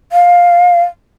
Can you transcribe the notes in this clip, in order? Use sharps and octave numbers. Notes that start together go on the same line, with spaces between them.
F5